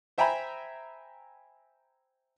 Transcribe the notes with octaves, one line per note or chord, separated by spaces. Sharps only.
C5 E5 G5 G#5 A#5 B5